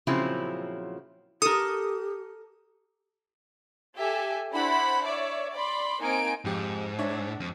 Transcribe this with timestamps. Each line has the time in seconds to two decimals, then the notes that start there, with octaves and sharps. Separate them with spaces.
0.07 A#2 C#3 F3 F#3 C4 E4
1.42 G4 A4 A#4 D#6
3.96 G4 A4 E5 G#5
4.53 D4 E4 C5 F#5 B5
5.04 C#5 D5 E5
5.53 D5 B5 C6
6.01 A#3 C4 D#4 A#4 G#5 D7
6.45 F2 G#2 G4
6.99 D4 C#5 E5
7.40 F2